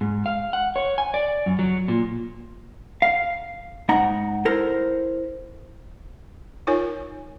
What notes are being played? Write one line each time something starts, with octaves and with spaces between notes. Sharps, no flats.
G#2
F5
F#5
C#5
G#5
D5
F#2
F#3
A#2
F5
G#2 D#4 F#5 A#5
E4 A4 A#4 C5
D#4 F4 A#4 C#5 G#5